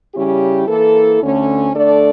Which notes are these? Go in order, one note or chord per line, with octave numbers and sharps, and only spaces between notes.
C#3 G3 C#4 E4 G4
E3 A#3 E4 A4
D2 D3 A3 C#4
D3 A3 D4 A4 D5